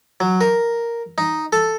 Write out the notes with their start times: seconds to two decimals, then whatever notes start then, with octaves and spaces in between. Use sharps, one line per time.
0.20 F#3
0.41 A#4
1.18 D#4
1.53 A4